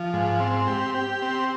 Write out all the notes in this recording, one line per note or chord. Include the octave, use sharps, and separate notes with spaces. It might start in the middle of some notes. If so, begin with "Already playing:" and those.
Already playing: F3
G#2
C4
G4
G4
C4